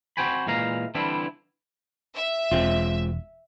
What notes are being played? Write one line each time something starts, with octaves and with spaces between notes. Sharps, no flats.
C4 F#4 C5 G5 G#5 B5
A#2 E3 G#3 F5 A#5
D3 E3 G3 C4 D4 E4
E5
E1 G#3 C4 F4